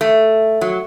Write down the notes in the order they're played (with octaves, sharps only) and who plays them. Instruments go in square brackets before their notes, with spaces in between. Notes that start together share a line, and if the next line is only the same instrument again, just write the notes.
[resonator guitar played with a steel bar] A3
F#3